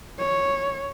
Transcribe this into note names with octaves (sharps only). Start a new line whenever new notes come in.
C#5